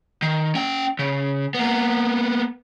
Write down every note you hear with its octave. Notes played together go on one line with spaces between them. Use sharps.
D#3
C#4 G5
C#3
A#3 B3